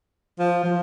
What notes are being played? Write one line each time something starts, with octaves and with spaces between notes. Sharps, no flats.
F3
F3